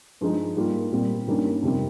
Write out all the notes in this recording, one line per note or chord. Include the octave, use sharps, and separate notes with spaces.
G2 F3 G#3 D#4
G#2 G3 A#3 F4
A#2 G3 C4
G2 D#3 G3 A#3 C#4
F2 C3 D#3 G3 C4